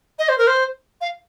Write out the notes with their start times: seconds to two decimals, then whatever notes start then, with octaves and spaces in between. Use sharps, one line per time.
0.19 D#5
0.29 C5
0.38 A#4
0.47 C5
1.01 F5